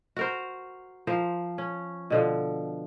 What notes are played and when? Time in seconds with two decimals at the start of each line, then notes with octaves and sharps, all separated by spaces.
0.16 F#4 A#4 C5
1.07 F3 A#4 C5
1.58 C#4
2.10 B2 D3 F3